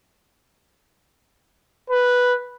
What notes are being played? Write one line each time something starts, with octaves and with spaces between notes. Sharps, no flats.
B4